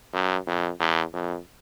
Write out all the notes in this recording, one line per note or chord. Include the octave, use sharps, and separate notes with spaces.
F#2
F2
E2
F2